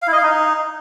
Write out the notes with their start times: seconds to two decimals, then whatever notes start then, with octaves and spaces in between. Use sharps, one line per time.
0.02 F5
0.07 E4
0.12 D#5
0.18 F5
0.23 D#4